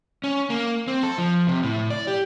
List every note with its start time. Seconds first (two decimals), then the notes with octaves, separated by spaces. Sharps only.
0.24 C#4
0.50 A#3
0.88 C4
1.03 A4
1.18 F3
1.47 C3
1.63 A2
1.90 D5
2.07 G4